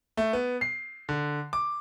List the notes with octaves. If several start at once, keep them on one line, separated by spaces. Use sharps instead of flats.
A3
B3
C7
D3
D6